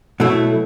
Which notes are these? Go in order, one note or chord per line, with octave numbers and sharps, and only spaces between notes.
B2 F#3 A3 E4